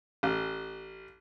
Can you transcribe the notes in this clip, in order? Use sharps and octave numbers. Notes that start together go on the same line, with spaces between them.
A1